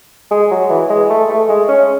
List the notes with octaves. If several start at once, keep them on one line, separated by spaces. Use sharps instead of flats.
G#3
F#3
E3
G#3
A3
A3
G#3
C#4